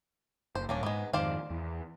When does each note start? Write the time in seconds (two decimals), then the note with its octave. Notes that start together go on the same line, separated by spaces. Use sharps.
0.55 F#1 C5
0.69 D#1 A#3 C#4 D4
0.83 G#2 G#3 B3
1.13 F2 G#2 D#3 C5 D5 F5
1.50 E2